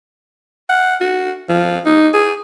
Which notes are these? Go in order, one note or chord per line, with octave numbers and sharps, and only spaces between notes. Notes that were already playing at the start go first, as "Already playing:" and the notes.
F#5
F#4
F3
D#4
G#4